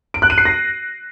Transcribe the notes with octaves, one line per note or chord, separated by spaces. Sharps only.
D7
F#6
D#7
C7
A#6